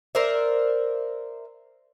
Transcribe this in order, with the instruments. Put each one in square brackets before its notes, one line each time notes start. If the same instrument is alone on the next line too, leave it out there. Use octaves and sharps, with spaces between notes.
[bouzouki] A#4 C5 D5 E5